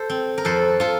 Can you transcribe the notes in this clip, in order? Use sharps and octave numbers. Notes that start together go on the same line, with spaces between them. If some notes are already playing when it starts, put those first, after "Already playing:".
Already playing: A4 C5
C4
A#4
F2 A4 C5
F4 A4